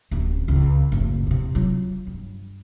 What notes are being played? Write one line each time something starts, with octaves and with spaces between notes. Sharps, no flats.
D1 A1
C#2
F#1 A2
E2 C3
F#3 F4
G2